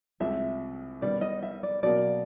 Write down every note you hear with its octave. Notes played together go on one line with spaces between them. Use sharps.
C2 C3 F3 G#3 E5
D#3 G3 B3 D5
D#5
E5
D5
B2 F#3 A#3 D5